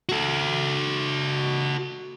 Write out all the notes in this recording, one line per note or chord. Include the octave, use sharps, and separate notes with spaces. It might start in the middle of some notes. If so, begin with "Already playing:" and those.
F#4 A4